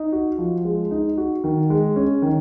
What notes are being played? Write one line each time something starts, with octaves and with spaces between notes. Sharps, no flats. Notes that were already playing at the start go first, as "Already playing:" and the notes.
Already playing: D#4
F#4
F3
G#3
D#4
F#4
D#3
G#3
C#4
D#3